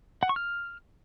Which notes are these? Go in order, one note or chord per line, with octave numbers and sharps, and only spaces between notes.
F#5
C#6
F6